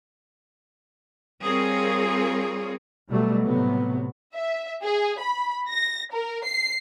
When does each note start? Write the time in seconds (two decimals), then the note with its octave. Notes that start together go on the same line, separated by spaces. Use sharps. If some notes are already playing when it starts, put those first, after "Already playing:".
1.43 G3 C4 F4 G#4 A#4 C#5
3.07 B2 F#3 G3 A3
3.44 A2 C3 F#3 B3
4.34 E5
4.83 G#4
5.20 B5
5.69 A#6
6.12 A#4
6.45 C7